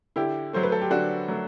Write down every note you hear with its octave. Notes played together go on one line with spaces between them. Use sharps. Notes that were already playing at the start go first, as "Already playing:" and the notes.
D3 E4 G4
F#3 A3 C5
B4
A4
G4
D3 D4 F#4
F#3 A3